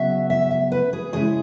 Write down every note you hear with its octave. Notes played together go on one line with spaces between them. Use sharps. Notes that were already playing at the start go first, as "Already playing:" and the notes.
Already playing: C#3 F#3 B3 E5
E5
E5
B4
G#4
C#3 G#3 E4 G#4